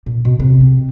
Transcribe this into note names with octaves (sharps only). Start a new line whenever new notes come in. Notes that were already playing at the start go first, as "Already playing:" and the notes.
A#2
B2
C3
C4